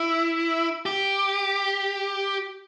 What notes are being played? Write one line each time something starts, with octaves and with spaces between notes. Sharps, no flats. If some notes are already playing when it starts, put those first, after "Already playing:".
Already playing: E4
G4